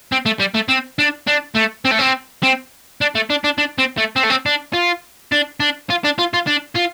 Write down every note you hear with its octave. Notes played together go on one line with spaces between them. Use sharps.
C4
A3
G3
A3
C4
D4
D4
A3
C4
A3
C4
C4
D4
A3
D4
D4
D4
C4
A3
C4
A3
C4
D4
F4
D4
D4
F4
D4
F4
F4
D4
F4